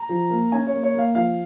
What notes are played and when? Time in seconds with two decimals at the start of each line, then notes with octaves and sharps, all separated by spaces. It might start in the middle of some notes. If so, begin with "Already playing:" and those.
Already playing: A#5
0.09 F3
0.30 A#3
0.52 C#4 G#5
0.67 C#5
0.73 A#3
0.83 C#5
0.94 A#3 F5
1.15 F3 F5